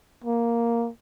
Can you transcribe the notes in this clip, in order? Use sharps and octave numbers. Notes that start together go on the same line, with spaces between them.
A#3